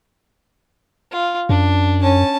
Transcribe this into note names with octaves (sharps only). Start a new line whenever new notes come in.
F4
F#2 D4
C#4 A5